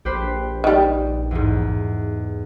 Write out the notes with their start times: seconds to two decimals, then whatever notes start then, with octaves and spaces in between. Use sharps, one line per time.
0.05 A#1 G4 B4 C5
0.64 D#3 G3
1.31 E2 G#2